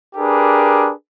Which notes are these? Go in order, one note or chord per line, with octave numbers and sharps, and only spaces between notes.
D4 G4 G#4 A#4 B4